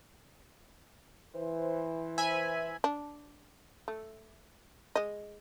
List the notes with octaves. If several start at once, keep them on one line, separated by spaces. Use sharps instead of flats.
E3 C5
E5 G#5 B5
D4
A3
G#3 D#5